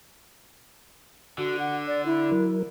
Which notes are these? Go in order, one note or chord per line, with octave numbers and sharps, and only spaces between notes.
D3 F#4
F#5
D5
E4
F#3 A#4